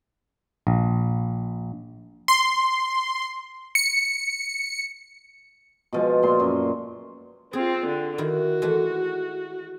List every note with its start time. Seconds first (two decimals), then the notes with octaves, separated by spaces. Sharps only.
0.67 A#1
2.28 C6
3.75 C#7
5.93 B2 F3 G#3
6.23 A#2 C6
6.40 F#2
7.53 C4 F4 G#4
7.86 D3
8.18 D#3 E4 F#4
8.62 E3 G#3 A3